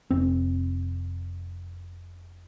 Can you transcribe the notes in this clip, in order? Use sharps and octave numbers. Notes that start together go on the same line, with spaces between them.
F1 C4